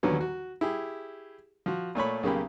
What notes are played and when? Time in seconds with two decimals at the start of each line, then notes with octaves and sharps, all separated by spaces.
0.03 D#2 D3 E3 F#3 B3
0.21 F#4
0.61 E4 G4 G#4
1.66 F3 F#4
1.95 A#2 A3 C#5 B5
2.23 B1 C#3 A#3 G4 B5